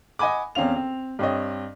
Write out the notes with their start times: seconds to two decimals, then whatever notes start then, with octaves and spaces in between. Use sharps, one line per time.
0.19 D#5 F#5 G#5 B5 D6
0.55 E2 C4 C#4 F5 F7
0.76 C4
1.19 G2 C4 C#5 D#5